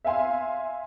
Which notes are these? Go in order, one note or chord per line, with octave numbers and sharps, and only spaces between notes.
E5 F5 G#5 C6